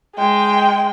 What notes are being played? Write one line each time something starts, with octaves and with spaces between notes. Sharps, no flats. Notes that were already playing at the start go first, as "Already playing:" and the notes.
G#3 G5